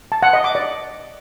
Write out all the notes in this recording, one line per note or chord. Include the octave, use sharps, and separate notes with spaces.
A5
F#5
D#5
D6
D5